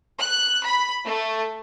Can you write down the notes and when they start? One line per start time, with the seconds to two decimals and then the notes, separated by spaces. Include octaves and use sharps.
0.20 F#6
0.65 B5
1.05 A3